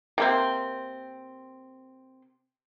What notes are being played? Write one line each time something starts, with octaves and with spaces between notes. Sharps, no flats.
C3 A#3 C4